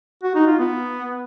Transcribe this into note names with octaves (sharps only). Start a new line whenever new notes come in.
F#4
D#4
F4
B3